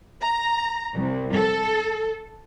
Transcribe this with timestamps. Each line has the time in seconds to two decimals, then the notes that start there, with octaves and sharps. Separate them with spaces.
0.21 A#5
0.95 C2
1.34 A4